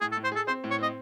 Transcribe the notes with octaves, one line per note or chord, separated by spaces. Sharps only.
A2 G#4
A4
A2
C5
G#4 A4
C4 C5
A2
C#5
C4 D#5